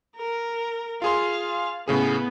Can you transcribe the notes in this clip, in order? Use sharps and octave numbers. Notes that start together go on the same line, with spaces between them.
A#4
F4 G#4 F5 C6
A2 C#3 B3 G#4